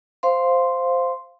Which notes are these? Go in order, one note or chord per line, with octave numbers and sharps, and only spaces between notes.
C5 F5 C6